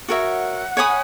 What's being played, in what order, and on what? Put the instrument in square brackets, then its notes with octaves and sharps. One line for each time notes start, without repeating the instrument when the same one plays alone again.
[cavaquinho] F#4 A#4 C#5 E5 [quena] F#5
[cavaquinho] C#5 G#5 B5 D#6